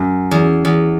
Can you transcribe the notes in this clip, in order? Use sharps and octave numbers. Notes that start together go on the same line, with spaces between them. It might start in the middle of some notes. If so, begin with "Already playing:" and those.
Already playing: F#2
E2
E2